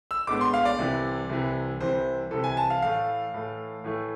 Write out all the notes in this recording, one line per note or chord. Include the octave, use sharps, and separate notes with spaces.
E6
A2 G#3 B3 D4 D6
C6
F5
D5
C2 C3 E3
C2 C3 E3
C2 C3 E3 C5
C2 C3 E3 A4
G#5
A5
F5
A2 E3 A3 F5
A2 E3 A3
A2 E3 A3